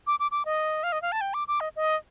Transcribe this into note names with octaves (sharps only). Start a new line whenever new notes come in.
D6
D6
D6
D#5
F5
D#5
F5
A5
G5
D6
D6
D#5
D#5